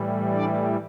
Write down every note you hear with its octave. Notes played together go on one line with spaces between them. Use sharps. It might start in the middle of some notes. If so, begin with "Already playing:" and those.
Already playing: A2 E3 G3
D4 D5